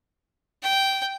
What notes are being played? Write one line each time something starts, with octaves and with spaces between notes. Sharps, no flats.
G5